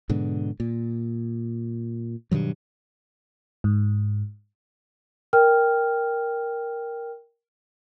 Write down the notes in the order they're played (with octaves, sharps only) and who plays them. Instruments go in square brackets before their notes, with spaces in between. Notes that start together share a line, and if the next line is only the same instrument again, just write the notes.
[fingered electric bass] G#2 B2 D3
A#2
G2 B2 D#3 F#3
[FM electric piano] G#2
[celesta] A#4 G5 F6